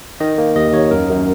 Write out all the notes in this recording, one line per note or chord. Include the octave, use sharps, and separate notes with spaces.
D#3 D#5
A#3
D#2 D#5
D#2 C#5
F#2 A#4
F#2